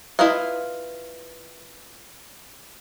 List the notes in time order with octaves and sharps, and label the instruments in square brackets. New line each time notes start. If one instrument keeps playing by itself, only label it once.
[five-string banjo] E4 F4 B4 D#5 F5